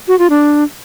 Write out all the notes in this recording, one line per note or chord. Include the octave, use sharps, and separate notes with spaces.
F#4
F4
D4